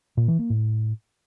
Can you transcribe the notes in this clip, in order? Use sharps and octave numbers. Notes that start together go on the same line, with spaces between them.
A#2
E3
A#3
A2